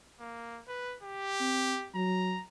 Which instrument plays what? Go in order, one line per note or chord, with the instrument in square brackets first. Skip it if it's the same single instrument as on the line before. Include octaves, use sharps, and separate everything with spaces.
[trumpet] A#3
B4
G4
[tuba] C4
[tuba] F#3 [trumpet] A#5